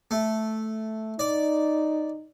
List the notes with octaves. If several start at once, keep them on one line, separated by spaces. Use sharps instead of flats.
A3
D#4 D5